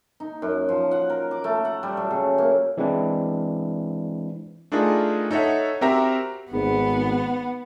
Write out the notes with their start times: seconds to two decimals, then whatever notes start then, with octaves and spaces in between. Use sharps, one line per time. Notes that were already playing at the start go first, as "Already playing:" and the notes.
0.20 D#4
0.42 F#2
0.69 F3
0.91 F#5
1.10 A#4
1.31 D6
1.44 A3
1.65 F#5
1.83 G3
1.97 F#3
2.11 C#3
2.38 A#3
2.77 E3 G#3 C4 D4 E4
4.72 A3 D4 D#4 F4 G#4 A#4
5.31 D#4 A4 C#5 E5 F#5
5.81 C4 F#4 G4 A#4 E5 A#5
6.51 G#1 B3